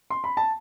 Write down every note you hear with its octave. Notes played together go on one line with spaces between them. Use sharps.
C6
B5
A5